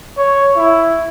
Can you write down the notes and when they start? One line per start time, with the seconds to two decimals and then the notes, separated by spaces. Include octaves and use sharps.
0.17 C#5
0.56 E4